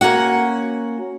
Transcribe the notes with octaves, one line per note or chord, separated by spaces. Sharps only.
A#3 C#4 F#4 F#5